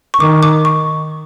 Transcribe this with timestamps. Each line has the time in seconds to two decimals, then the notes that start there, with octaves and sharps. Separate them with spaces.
0.14 C#6
0.20 D#3 D6
0.43 D6
0.65 C#6